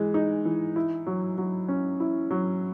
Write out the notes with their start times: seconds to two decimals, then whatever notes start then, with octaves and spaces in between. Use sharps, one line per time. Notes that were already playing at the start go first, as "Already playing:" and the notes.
Already playing: E3 G#3
0.14 D#4
0.45 E3
0.76 E4
1.06 F#3
1.38 F#3
1.68 C#4
2.00 E4
2.31 F#3